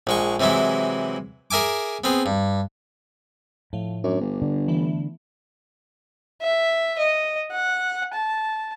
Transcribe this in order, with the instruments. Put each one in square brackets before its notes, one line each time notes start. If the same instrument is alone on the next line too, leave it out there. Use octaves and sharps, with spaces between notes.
[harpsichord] A#1 G#3 C#6
C3 E3 F#3 G#3 E4
G#4 A#4 E5 G#5 D6
B3 C4 G#4
G2
[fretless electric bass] A2 [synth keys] F3 A3
[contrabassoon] F#2 [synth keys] D4
[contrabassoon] G1
[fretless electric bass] D3
[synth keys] E3 A3 B3
[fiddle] E5
D#5
F#5
A5